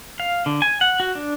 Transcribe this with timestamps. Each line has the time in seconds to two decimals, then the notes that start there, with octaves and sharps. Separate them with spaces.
0.20 F5
0.46 D3
0.62 G#5
0.81 F#5
1.00 F#4
1.15 D4